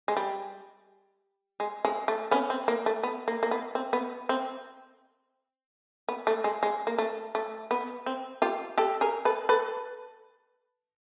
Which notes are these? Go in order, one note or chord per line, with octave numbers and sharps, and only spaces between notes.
G#3
G3
G#3
G#3
A3
B3 C#4
C4
A#3
A3
B3
A#3
A#3
B3
C4
B3
C4
B3
A3
G#3
G#3
A#3
A3
A3
B3
C4
F4 G4
G4 A4
G#4 A#4
A4 B4
A4 B4